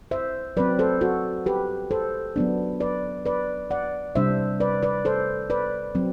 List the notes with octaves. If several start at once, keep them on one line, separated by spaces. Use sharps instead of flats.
C5 E5
F#3 C4 B4 D5
A4 C5
F#4 A4
G4 B4
A4 C5
F#3 B3 D4
B4 D5
B4 D5
D5 F#5
C3 G3 D4 C5 E5
B4 D5
B4 D5
A4 C5
B4 D5
F#3 C4